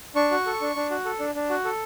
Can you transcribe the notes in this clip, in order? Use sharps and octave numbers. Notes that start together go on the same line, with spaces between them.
D4 C#6
F#4
A4
D4
D4
F#4
A4
D4
D4
F#4
A4